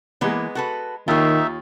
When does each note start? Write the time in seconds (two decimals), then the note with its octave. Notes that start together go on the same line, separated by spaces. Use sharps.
0.21 E3 G#3 A#3 B3
0.55 F#4 A4 B4
1.08 D#2 D#3 D#4 F4 C#5 E5